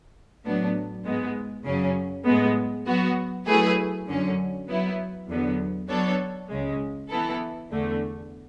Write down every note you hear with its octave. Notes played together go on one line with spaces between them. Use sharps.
A2 F#3 B3 D4
G#2 G#3 B3
F#2 C#3 F#3 C#4
A2 G#3 B3
F#3 B3 F#4
F#3 A3 E4 G#4 B4
F#2 D3 F#3 C#4
F#3 B3 E4
E2 D3 F#3 B3
F#3 B3 D4 A4 C#5
C#2 C#3 G#3
E3 B3 E4 A4
E2 D3 A3